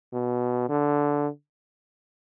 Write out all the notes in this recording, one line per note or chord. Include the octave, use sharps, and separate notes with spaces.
B2
D3